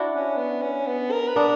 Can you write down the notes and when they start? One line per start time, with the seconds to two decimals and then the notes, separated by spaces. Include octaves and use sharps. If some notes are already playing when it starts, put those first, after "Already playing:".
Already playing: D4 E4 F#4
0.12 C#4
0.37 B3
0.62 C#4
0.87 B3
1.12 A#4
1.28 B4
1.36 B3 D4 A#4